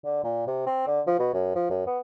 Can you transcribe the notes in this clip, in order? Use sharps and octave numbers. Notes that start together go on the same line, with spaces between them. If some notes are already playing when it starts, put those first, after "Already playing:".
D3
A#2
C3
C4
D3
F3
B2
F#2
F3
F#2
B3